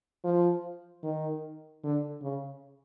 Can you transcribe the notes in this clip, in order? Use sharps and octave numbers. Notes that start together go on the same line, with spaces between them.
F3
D#3
D3
C#3